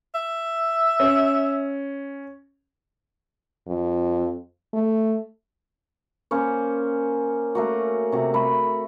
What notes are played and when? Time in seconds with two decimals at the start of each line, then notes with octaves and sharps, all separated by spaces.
0.15 E5
1.00 C#4
3.67 F2
4.74 A3
6.31 A#3 C#4 C5 C#5
7.55 A3 A#3 F#4
8.12 C3 F#4
8.34 A3 B5